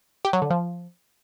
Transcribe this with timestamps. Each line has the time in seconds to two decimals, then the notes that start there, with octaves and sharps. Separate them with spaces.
0.25 G4
0.33 F#3
0.42 D3
0.50 F3